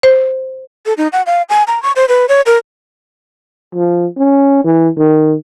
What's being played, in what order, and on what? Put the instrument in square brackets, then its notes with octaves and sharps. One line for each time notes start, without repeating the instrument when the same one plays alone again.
[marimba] C5
[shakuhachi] A4
D#4
F#5
F5
G#5
A#5
C#6
C5
B4
C#5
A#4
[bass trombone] F3
C#4
E3
D#3